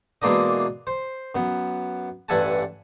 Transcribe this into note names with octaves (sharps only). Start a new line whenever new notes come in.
B2 E3 G#3 A#3 D4 D#5
C5
F#2 B3
A1 G2 E5 F#5 G#5 A5